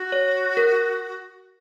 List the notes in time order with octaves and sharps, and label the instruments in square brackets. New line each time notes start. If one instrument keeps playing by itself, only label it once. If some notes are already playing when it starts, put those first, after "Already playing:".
Already playing: [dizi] F#4
[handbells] C#5
A#4